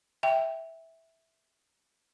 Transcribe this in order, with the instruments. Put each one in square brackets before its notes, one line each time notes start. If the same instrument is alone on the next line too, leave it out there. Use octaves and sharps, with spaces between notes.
[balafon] E5 G5